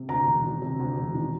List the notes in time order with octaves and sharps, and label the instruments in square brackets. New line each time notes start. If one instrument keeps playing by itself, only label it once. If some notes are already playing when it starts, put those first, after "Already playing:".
Already playing: [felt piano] C3
[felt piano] D2 [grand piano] A#5
[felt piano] E1
D#3
C3
D2
E1
D#3